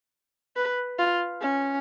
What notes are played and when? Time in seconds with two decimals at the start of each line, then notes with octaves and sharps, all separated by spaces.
0.57 B4
0.99 F4
1.41 C#4